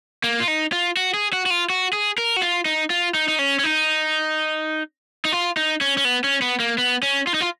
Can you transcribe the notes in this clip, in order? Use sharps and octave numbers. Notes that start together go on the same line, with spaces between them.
A#3
F4
D#4
F4
F#4
G#4
F#4
F#4
F4
F#4
G#4
A#4
F#4
F4
D#4
F4
D#4
D#4
C#4
C#4
D#4
D#4
F4
D#4
C#4
C#4
B3
C#4
B3
A#3
B3
C#4
F4
D#4
F4